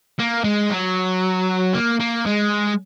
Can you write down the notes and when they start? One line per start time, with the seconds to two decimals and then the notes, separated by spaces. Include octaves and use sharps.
0.19 A#3
0.44 G#3
0.70 F#3
1.73 A#3
1.99 A#3
2.26 G#3